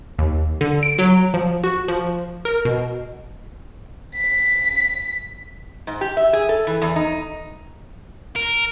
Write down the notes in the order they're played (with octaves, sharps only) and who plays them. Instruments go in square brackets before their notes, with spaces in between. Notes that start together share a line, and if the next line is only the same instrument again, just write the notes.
[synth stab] D#2
D3
D7
F#3
F3
F#4
F3
A#4
B2
[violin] B6
[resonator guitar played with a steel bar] G#2
G4
E5
G#4
A4
E3
E2
D#4
[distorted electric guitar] A#4